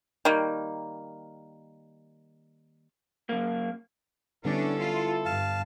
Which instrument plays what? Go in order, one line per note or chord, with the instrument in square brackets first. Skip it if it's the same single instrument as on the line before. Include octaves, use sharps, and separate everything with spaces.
[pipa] D#3 G3 A#3
[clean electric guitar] F#2 A#3
[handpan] D3 G3 B3 [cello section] C#4 D4 [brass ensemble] E4 A4
[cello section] F4
[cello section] G2 [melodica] F5 A5